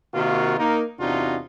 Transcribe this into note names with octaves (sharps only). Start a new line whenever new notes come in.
C3 D#3 A#3 F4 F#4
A#3 D#4 A#4
E2 C3 D4 D#4 F4 F#4